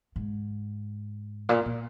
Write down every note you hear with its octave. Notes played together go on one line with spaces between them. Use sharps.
G#2
A#2
A#2